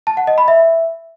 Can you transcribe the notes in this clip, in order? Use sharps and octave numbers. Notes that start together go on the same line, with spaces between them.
A5
F#5
D#5
B5
E5